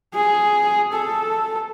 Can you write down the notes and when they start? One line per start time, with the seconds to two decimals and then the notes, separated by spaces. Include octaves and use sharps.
0.14 G#4
0.94 A4